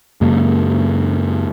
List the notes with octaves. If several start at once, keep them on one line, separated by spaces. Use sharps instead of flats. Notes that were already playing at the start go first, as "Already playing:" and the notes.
F#2 C#3 G#3 A#3